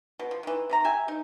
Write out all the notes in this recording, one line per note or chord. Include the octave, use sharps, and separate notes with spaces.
B2
F3
D#3 E3
C3 D#3 A#5
G4 E5 G#5
D#4